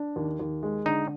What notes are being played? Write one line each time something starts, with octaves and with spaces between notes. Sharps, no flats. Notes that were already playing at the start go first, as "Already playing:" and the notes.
Already playing: D4
D#2
D#2
G#3
D3 D#4